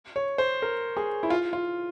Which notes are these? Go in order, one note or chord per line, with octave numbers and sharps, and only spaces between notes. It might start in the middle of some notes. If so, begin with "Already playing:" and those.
C#5
C5
A#4
G#4
E4
F4
F4